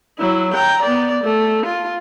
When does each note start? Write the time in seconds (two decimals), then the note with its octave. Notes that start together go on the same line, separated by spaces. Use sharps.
0.19 F#3 E4
0.54 G5 A#5
0.82 B3 D5
1.24 A3
1.66 F4